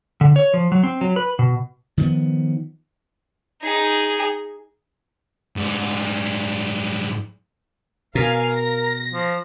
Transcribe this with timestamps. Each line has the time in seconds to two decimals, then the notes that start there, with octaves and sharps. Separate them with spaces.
0.21 D3
0.36 C#5
0.54 F3
0.72 F#3
0.83 C4
1.01 F#3
1.16 B4
1.39 B2
1.97 D#3 F3 G#3 B3
3.63 D#4 G#4
5.56 G#2 G3
8.15 B2 A#4 F5 G#5
8.53 A#6
9.12 F3